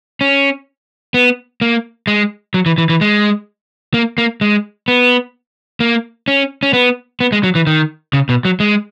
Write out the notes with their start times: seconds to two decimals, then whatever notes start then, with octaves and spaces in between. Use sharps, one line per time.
0.21 C#4
1.14 B3
1.61 A#3
2.07 G#3
2.54 F#3
2.66 E3
2.78 E3
2.89 E3
3.01 G#3
3.94 A#3
4.18 A#3
4.41 G#3
4.88 B3
5.80 A#3
6.28 C#4
6.63 C#4
6.73 B3
7.20 B3
7.32 G#3
7.43 F#3
7.55 E3
7.67 D#3
8.13 C#3
8.29 B2
8.45 F#3
8.60 G#3